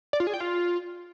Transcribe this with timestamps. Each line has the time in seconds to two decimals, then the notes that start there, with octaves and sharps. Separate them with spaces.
0.13 D5
0.20 F4
0.27 G#4
0.34 G5
0.40 F4